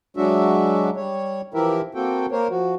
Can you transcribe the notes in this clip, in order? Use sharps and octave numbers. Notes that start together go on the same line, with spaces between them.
F#3 G#3 D4 F#4 E5
G3 C#5
E3 F3 E4 G4 A#4 E5
A#3 C4 F#4 A4 G5
A#3 A#4 C5 C#5
F3 F#4